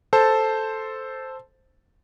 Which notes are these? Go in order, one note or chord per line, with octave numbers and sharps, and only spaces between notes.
A4 C5 A5